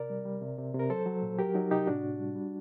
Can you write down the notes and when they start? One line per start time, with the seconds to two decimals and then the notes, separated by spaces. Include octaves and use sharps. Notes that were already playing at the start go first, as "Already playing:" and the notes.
Already playing: C3 A#4 D5
0.10 G3
0.25 G3
0.41 C3
0.58 C3
0.74 C3
0.79 A#4
0.90 F#3 A4 C5
1.06 F#3
1.22 A#2
1.39 F#3 G4 A#4
1.54 F#3 D#4
1.71 C3 D#4 G4
1.87 A2 D4 F#4
2.03 A2
2.20 G3
2.36 G3